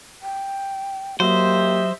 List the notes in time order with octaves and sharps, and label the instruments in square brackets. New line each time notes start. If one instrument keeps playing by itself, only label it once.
[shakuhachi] G5
[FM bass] F#3 [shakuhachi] A#3 [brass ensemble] G4 D#5 E5 [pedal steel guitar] C5